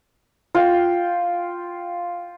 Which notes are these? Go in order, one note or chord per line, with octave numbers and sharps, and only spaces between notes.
F4 G5